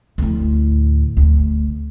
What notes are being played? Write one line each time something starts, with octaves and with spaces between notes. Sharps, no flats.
D2 A2
D2